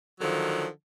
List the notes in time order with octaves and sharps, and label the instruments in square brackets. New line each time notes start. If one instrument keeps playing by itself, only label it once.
[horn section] D3 D#3 F3 F#3